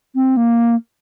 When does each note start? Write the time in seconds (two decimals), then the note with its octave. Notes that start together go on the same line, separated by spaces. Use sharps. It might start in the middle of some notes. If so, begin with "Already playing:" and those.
0.15 C4
0.37 A#3